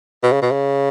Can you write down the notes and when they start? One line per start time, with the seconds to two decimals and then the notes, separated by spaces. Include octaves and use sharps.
0.23 B2
0.32 C#3
0.42 B2
0.52 C#3